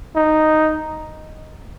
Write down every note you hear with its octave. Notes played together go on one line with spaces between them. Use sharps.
D#4